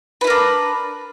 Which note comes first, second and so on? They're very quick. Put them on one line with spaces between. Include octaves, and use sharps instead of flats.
B4 E4 A#4 D4